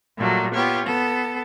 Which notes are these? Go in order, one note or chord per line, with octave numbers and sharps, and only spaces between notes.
A#2 F#3 G3 A3 A#3
B3 F4 G4 C#5
B3 A4